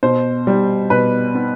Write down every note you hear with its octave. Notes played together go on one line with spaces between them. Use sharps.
B2 C5
G3
B2 B4
B3